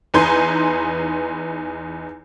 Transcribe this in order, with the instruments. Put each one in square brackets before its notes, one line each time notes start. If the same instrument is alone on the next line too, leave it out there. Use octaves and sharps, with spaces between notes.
[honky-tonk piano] E2 D#4 B4 G#5 C6 G6